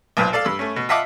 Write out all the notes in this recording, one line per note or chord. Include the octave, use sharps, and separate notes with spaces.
B1 A#2 B4 C5
A4 D5 F5
G2 E6
A3 C#4
B2
F4 D#5 E5 F#5 A5 D6